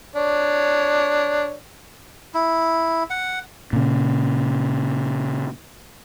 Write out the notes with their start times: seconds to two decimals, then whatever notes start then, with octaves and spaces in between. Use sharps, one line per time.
0.15 D4 C#5
2.34 E4
3.10 F#5
3.73 A#2 C#3